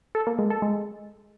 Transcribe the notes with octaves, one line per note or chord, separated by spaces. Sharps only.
A4
A#3
G#3
A4
G#3